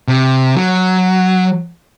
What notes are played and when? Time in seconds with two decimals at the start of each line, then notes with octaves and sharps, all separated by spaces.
0.08 C3
0.56 F#3